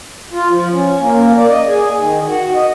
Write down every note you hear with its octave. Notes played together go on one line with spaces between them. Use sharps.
F4
F3
C#4
A#3
D5
D#5
G#4
D#3
F#4
D#5